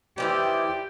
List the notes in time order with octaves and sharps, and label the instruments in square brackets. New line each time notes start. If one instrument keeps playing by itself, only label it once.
[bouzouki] D#3 E3 E4 [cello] G4 [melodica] C5 D5 G5